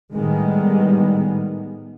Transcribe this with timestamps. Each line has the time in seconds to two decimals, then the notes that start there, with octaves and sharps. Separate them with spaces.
0.14 A2 D#3 G3 G#3 B3